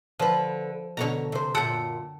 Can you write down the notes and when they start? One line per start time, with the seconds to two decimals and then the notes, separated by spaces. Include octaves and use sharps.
0.19 D3 F3 B4
0.97 B2 D3 A4 C#5 A#5
1.32 C3 C5
1.55 F#2 A#2 A4 F#5 G5